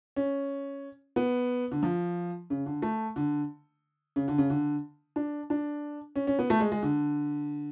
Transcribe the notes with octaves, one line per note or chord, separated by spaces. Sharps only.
C#4
B3
D3
F3
C#3
D3
A3
D3
C#3
D3
C#3
D3
D4
D4
C#4
C#4
B3
A3
G#3
G#3
D3